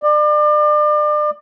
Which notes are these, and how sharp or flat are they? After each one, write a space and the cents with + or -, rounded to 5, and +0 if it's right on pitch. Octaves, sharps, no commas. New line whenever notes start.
D5 +35